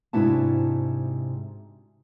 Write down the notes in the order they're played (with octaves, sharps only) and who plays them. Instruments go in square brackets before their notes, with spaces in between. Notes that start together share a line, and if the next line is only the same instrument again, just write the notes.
[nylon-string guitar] G#2 C3 D4 E4 F#4 A5